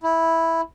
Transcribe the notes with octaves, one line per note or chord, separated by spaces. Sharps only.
E4